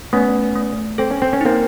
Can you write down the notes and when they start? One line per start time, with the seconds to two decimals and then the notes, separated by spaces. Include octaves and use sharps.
0.13 A3 B3 C#4
0.56 A3
0.98 C4 A4
1.11 C#4
1.22 C4
1.33 C#4
1.41 A#3 C4 D#4